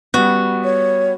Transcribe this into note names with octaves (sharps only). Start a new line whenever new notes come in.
G3 B3 F#4
C#5